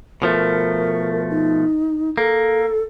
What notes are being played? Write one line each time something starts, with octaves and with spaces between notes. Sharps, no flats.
B2 F3 A3 A#4
D#4
A#3 A4